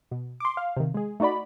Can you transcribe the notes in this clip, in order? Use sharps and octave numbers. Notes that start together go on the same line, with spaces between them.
B2
C6 D6
F5
C3 D#3
G#3 G#4
A3 D#4 F#4 D5 B5